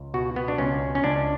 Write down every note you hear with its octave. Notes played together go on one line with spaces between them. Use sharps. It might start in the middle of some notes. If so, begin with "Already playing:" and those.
Already playing: C#2
B2 F#4
B3
D4
C#2 C#4
C#4
C#2 D4